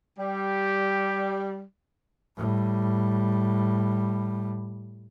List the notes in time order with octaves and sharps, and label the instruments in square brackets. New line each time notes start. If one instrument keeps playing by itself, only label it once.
[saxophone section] G3 [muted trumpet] G4
[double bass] A2 G3